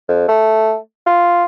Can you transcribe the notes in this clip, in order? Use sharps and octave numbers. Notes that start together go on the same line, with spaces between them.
F2
A3
F4